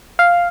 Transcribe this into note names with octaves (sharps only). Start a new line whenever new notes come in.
F5